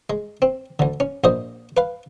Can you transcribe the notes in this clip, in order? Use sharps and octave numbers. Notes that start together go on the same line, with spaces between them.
G#3
C4
D2 D3
C#4
A#1 A#2 C5 D#5
B4 F5